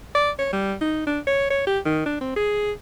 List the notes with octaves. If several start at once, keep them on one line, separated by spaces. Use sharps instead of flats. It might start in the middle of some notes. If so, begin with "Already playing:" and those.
D5
C#5
G3
D#4
D4
C#5
C#5
G4
D#3
D4
C4
G#4